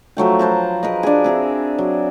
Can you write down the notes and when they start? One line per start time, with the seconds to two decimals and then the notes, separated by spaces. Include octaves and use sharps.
0.17 F3 F#3 A3 G5
0.39 B4 C5 A5 A#5
0.83 G#4 A#4 B4 D#5
1.03 D4 G#4
1.24 C4 G#4 E5 A#5
1.78 F#3